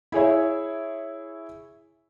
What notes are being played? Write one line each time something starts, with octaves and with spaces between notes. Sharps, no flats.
E4 G#4 C#5 E5